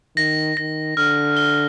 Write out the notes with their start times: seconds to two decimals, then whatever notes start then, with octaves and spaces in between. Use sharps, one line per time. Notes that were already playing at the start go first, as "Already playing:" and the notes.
0.17 D#3 A#6
0.57 D#3 A#6
0.97 D3 F6
1.37 G7